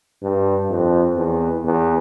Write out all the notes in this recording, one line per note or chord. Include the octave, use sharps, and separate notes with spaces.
G2
F2
E2
E2